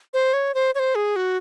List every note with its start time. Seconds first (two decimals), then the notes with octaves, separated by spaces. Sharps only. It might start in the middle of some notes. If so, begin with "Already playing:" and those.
0.14 C5
0.33 C#5
0.54 C5
0.75 C#5
0.79 C5
0.95 G#4
1.16 F#4